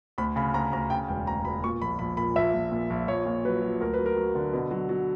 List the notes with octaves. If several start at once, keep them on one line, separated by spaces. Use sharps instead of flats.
D2 B5
C#3 B5
D2 A#5
D2 A#5
C#3 G5
E1 G5
D2 A#5
E1 B5
A#2 C#6
A#1 B5
A#1 B5
A#2 B5
A#1 E5
A#1
A#2
A#1
A#1 C#5
A#2
F#3 B4
F#3
D2 A#4
B4
F#3
A#4
F#3
D3
B2
F#3
F#3